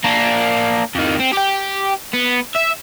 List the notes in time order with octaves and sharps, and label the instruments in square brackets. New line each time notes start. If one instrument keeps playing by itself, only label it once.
[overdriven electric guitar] A#3 D4
F2 D#3
C4
G4 G5
B3
E5